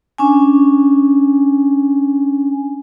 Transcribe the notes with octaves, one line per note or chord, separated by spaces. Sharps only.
C#4 D4 G#5